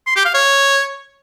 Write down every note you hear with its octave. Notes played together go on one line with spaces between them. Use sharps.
C6
G4
F5
C#5